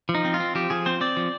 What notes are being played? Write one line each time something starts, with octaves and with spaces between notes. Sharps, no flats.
F3
D#4
C4
F4
C4
F3 G4
F3 G#4
C4 C5
C4 D5
F3